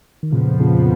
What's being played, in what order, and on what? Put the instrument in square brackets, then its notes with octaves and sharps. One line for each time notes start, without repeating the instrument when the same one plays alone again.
[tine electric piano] D#3
[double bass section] F2 F3 B3 [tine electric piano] A#2 C#3
[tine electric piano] A#2 C#3